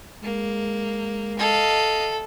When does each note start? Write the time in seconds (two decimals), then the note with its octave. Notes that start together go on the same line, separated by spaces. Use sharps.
0.23 G#3 A#3
1.39 A4 D#5 F5